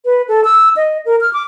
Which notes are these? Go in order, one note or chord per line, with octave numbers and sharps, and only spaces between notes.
B4
A4
E6
D#5
A#4
F6
D6